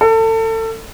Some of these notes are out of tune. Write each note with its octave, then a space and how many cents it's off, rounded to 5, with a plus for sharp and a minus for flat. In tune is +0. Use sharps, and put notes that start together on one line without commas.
A4 +30